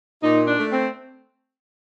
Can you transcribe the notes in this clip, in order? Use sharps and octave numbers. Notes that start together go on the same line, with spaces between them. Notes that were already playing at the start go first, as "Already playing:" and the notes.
A#2 D#4
D4
A3
C4